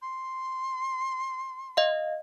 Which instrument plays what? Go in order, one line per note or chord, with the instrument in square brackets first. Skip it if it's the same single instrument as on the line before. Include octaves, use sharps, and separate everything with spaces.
[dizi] C6
[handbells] D#5 F5